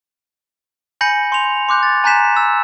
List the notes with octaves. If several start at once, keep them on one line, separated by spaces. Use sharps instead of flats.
G#5 B5 G6 A#6 C#7 F#7
C6 F7
C6 D6 F#6 G6
A6
G#5 A#5 F#6 G6 B6 E7
E6